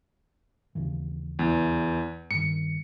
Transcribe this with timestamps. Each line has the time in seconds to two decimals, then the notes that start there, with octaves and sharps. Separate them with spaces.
0.75 D#2 C#3 E3
1.39 E2
2.31 G2 D#3 C#7